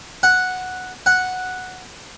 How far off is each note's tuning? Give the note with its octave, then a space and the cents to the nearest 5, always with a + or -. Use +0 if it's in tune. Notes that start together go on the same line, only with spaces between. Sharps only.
F#5 -5
F#5 -5